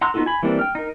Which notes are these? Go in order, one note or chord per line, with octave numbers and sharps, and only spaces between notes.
F#5 A#5 C6 E6 F#6
B3 D#4 F4 F#4 A4
G#5 B5
E3 G3 A#3 C4 D4
G5 F6
D#4 A#4